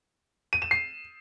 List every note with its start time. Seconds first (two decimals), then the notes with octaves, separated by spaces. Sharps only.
0.53 D#7
0.62 E7
0.71 C7